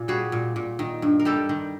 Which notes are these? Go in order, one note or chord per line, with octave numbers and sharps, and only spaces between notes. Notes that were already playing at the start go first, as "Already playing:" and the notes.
Already playing: A#2 A#3
G3 F#4 G#4
A#2
A#2
D#3
G2
A#4
G3 G4 A4
D#3